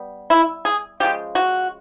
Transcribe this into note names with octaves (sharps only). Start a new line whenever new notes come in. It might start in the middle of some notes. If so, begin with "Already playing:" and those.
Already playing: G3 B3
E4
G#4
C#3 F3 G#3 G4
F#4